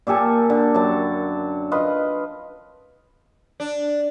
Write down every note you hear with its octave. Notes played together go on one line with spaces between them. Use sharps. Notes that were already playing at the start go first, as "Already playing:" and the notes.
A#2 G4 A4 G#5
D3
F#2 A5
F4 B4 D#5
D4